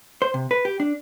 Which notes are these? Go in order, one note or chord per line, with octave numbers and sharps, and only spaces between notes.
C5
C3
B4
G4
D4